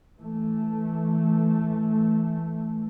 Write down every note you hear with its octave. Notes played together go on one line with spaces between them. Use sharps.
E3 A3